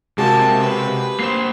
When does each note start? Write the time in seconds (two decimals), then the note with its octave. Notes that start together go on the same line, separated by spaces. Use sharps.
0.18 C3 G#3 A#3 F#4 G4 A5
0.60 B4
1.20 A#3 C5 C7 E7